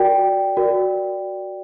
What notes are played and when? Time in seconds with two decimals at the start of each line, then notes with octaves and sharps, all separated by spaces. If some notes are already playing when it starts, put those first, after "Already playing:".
Already playing: F#4 A#4 D5 G5
0.57 F#4 A#4 D5